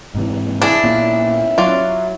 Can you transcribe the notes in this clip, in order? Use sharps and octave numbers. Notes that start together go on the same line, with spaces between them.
G#2 C3 E3
D4 E4 G#4
A#2 B3 C#4
F#3 F4 D5